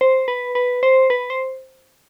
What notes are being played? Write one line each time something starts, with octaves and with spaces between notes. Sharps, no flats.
C5
B4
B4
C5
B4
C5